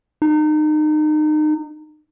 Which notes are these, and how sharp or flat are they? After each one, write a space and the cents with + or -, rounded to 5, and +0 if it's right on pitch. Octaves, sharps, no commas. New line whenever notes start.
D#4 -30